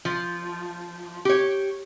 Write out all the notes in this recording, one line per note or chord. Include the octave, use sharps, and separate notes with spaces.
F3
G4 C#5